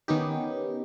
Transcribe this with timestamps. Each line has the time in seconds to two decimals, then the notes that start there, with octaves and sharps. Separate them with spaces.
0.08 D#3 B3 C#4 D#4 G4